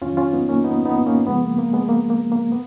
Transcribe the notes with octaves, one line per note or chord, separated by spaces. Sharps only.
F2 D#3 F#3 C#4 F4
C#4 F4
B3 D#4
A#3 C#4
B3 D#4
B3 D#4
A#3 C#4
F#2 C#3 F3 G#3 B3
A#3
A#3
G#3 B3
A#3
A#3
A#3
B3